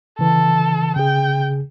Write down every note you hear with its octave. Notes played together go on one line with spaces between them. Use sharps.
C#3 E3 A4
C#3 G#4 G5